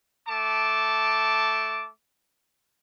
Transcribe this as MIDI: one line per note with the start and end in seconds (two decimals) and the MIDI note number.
0.28 1.89 57
0.28 1.89 81
0.28 1.89 86